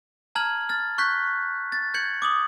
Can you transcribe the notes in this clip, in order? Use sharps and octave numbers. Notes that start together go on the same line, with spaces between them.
A5 A#5 F6 G#6 F#7
F6 A6
C#6 F#6 G6 B6
A6
G6 G#6 C#7 F#7
D6 D#6 F#7